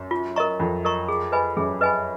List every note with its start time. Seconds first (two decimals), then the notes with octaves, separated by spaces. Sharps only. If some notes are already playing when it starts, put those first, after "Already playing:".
Already playing: F#2
0.11 F4
0.36 A#4 D#5 A#5 C#6
0.60 F2 F4
0.85 A#4 D#5 A#5 C#6
1.08 G#4
1.32 B4 D#5 G#5 B5
1.57 F#2 G#4
1.81 B4 D#5 G#5 B5